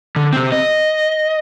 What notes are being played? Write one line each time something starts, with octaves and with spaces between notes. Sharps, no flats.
D3
C3 C4
D#5